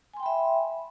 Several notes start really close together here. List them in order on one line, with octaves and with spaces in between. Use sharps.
G#5 C6 G5 B5 E5